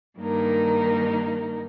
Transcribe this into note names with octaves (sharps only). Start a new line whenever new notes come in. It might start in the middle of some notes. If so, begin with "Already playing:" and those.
G2 D#3 A#3 D#4 A#4